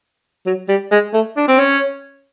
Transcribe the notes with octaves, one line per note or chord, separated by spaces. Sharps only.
F#3
G3
G#3
A3
D4
C4
C#4